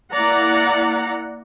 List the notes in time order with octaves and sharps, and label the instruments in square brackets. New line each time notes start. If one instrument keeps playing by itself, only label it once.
[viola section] A#3 E4 D5 F#5 A#5